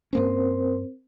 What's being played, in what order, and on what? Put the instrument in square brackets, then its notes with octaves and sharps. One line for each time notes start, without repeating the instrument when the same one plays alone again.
[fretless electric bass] G2 A#3 C#4 [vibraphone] C4 A#4 C5